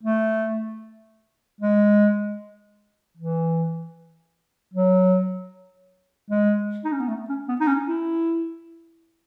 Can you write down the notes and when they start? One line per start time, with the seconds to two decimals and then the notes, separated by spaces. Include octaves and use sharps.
0.03 A3
1.61 G#3
3.17 E3
4.74 F#3
6.31 G#3
6.85 D#4
6.93 C#4
7.00 B3
7.08 A3
7.29 C#4
7.49 B3
7.60 D#4
7.68 C#4
7.88 E4